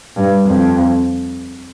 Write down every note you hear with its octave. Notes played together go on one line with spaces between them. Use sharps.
G2
F2